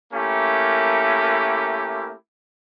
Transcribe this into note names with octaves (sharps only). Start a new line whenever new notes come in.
A3 A#3 C#4 E4 G4 A#4